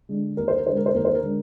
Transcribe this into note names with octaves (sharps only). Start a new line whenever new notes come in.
D3 G#3
D#2 A#4
C5
A#4
D3 G#3 C5
A#4
C5
D#2 A#4
C5
A#4
D3 G#3